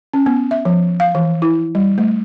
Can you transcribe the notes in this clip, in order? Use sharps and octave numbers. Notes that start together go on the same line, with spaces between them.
C#4
B3
E5
F3
F5
E3
E4
G3
A3